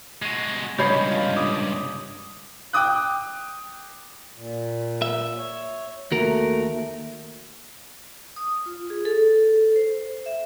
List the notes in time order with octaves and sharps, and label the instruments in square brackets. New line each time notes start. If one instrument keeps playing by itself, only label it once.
[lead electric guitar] G#3 F#4 [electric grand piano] C7 D#7
[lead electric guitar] C#2 G2 [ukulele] C#5 D#5 B5 [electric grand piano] G6 G#6 C7
[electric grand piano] F4
D6 D#6
[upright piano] G5 D6 D#6 F#6
[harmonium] A#2
[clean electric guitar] E5
[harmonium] C#5
[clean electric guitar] D#2 F#4 A#4 [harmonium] A3
[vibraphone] D#6
F4
G#4
A4
C5
E5